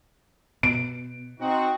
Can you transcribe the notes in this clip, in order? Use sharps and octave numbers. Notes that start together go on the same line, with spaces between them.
B2 D7
C4 D#4 F#4